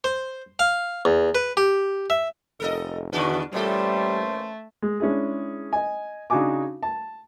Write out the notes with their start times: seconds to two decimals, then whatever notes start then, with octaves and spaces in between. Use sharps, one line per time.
0.04 C5
0.59 F5
1.05 E2
1.35 B4
1.57 G4
2.10 E5
2.60 F1 A4 A#4 D#5
3.13 E2 B2 D3 D4 F#4 B4
3.53 A#2 E3 G3 A3 A#3 C#4 A4 C5
4.82 G#3
5.00 G#3 C#4 D4 E4 G#4
5.73 D#5 G#5
6.30 C#3 D4 D#4 F#4 G#5 D6
6.83 A5